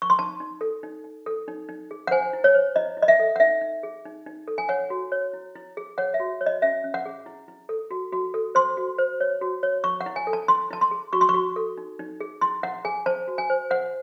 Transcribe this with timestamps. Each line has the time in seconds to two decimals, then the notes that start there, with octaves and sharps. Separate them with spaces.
0.02 C#6
0.10 C6
0.19 D#4 A5
0.40 D#4
0.61 A4
0.83 D#4
1.04 D#4
1.26 A4
1.48 D#4
1.69 D#4
1.91 G#4
2.07 F#5
2.11 C5 G#5
2.33 E4
2.44 C#5
2.55 C5
2.76 E4 D#5
2.97 E4
3.02 D#5
3.08 E5
3.19 A4
3.36 F#5
3.40 D#4 E5
3.61 D#4
3.83 G#4
4.05 D#4
4.26 D#4
4.48 A4
4.58 G#5
4.69 C#5 F#5
4.90 F#4
5.12 C#5
5.34 E4
5.55 E4
5.77 G#4
5.98 C#5 F#5
6.14 E5
6.20 F#4
6.41 C#5
6.46 D#5
6.62 C#4 E5
6.84 C#4
6.94 F#5
7.06 G#4
7.26 E4
7.48 E4
7.69 A4
7.91 F#4
8.13 F#4
8.34 A4
8.55 C5 C6
8.77 F#4
8.98 C5
9.20 C#5
9.41 F#4
9.63 C#5
9.84 E4 C#6
10.01 F#5
10.06 E4
10.16 G#5
10.27 A4
10.33 A5
10.48 E4 C6
10.71 E4 A5
10.81 C6
10.91 G#4
11.13 F#4 C#6
11.21 C6
11.29 C#6
11.34 F#4
11.56 A4
11.78 D#4
11.99 D#4
12.21 G#4
12.41 E4 C6
12.63 E4 F#5
12.85 G#4 G#5
13.06 C5 A5
13.28 F#4
13.38 G#5
13.50 C5
13.70 C5 F#5